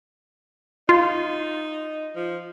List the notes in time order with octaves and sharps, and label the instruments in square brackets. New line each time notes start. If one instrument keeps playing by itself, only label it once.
[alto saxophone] D#4 [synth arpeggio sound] F4
[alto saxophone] F3